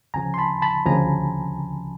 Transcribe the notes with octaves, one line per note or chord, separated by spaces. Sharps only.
D2 C#3 F3 G#5 A#5
C6
A5 B5
A5 B5
D2 C#3 F3 G#5 A#5